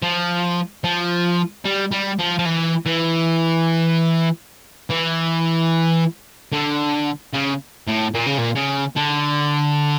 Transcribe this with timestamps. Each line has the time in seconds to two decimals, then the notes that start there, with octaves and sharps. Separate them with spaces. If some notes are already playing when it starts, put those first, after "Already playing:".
0.03 F3
0.84 F3
1.65 G3
1.91 G3
2.19 F3
2.39 F3
2.45 E3
2.86 E3
4.90 E3
6.53 D3
7.33 C#3
7.87 A2
8.14 A#2
8.27 C#3
8.38 A#2
8.56 C#3
8.96 D3